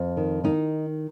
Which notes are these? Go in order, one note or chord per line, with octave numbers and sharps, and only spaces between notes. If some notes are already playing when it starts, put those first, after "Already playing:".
Already playing: F2
D#3
D#3 D#4